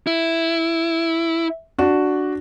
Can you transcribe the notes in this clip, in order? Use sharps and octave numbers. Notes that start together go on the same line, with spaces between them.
E4
D4 F#4